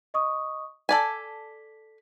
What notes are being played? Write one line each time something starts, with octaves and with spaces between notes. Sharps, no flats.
D#5 C#6 D#6
A4 D5 G#5 B6